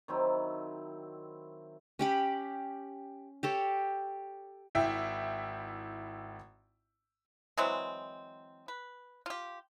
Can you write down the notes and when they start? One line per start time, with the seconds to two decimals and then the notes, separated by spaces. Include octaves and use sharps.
0.08 D#3 F#3 C4 E4
1.99 C#4 G4 B5
3.43 G4 A4 C#5
4.75 G#1 E4 E5 G5
7.57 E3 F#3 G#3 C4
8.68 B4
9.26 F4 G4